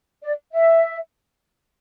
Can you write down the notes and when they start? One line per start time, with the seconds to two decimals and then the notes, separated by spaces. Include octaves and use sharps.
0.23 D5
0.53 E5